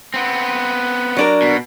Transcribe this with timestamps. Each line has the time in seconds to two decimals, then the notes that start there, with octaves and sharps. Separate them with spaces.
0.14 B3 C4
1.17 F#3 D4 A#4
1.42 B2